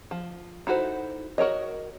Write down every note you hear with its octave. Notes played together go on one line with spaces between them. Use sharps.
F3
D#4 E4 F#4 A4 C5
F#4 A#4 C#5 D#5